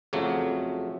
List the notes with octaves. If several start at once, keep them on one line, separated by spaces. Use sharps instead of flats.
F2 C#3 F#3 A3